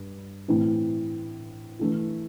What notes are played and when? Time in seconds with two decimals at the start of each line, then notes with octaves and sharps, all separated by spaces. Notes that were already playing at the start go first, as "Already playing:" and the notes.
Already playing: G2
0.48 A2 E3 A3 C4 E4
1.79 E3 A3 E4